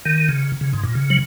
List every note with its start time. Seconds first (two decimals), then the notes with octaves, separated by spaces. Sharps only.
0.05 D#3
0.29 C#3
0.61 C#3
0.73 G#2
0.83 A#2
0.95 C#3
1.10 F#3